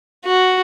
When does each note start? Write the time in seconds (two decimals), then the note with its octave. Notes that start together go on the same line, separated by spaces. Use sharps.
0.25 F#4